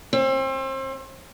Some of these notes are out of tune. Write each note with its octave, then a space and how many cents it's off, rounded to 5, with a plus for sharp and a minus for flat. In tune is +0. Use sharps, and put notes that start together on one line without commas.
C4 +35